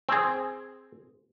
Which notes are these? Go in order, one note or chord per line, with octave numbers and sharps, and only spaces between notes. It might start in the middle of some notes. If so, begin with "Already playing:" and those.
C4 G#4